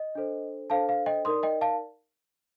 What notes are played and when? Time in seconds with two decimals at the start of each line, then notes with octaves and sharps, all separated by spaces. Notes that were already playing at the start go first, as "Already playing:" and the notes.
Already playing: D#5
0.15 D4 A4 C5
0.70 D4 A4 C5 F5 A5
0.89 F5
1.06 D#5 G5
1.25 D#4 A#4 D5 C6 D#6
1.43 D#5 G5
1.61 F5 A5